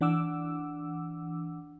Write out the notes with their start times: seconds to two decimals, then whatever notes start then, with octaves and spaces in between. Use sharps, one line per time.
0.01 E3 D4 F#5 D6 E6